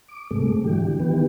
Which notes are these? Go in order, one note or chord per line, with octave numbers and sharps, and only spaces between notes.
D6
G#2 C3 G#3 A3
D3 E3 F#3 G4
D#3 E3 B3 G4